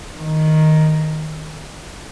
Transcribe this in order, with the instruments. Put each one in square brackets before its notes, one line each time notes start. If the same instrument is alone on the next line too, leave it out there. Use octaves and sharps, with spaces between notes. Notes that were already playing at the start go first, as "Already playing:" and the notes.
[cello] D#3